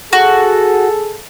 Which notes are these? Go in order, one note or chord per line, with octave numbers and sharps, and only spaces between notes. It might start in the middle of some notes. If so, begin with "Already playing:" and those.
F#4 G#4 A4